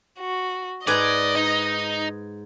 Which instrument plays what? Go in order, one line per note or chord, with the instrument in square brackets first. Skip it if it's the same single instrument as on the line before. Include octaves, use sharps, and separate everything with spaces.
[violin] F#4
[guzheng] G#2 B4 G#5 [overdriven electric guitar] D5 [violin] D#5
[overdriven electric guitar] D#4